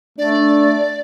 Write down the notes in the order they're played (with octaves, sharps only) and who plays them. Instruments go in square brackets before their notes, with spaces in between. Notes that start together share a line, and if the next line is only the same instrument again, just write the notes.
[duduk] A3 [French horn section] D4 [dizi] D5